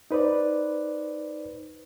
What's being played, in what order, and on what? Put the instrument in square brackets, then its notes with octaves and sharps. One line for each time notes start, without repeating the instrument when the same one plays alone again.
[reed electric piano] D#4 B4 C5 D5